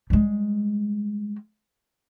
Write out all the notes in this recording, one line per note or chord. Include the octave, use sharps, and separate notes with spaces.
G3 G#3